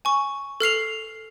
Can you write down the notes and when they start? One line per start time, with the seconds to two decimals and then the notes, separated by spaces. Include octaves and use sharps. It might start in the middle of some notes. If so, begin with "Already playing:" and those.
0.05 G#5 C#6
0.60 A4 F6 C7 F7